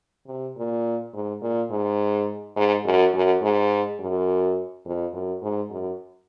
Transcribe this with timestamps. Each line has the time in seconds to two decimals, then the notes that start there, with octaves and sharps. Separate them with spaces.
0.27 C3
0.57 A#2
1.14 G#2
1.42 A#2
1.70 G#2
2.56 G#2
2.85 F#2
3.13 F#2
3.42 G#2
4.00 F#2
4.86 F2
5.13 F#2
5.42 G#2
5.70 F#2